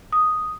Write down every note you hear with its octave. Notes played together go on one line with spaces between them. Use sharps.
D#6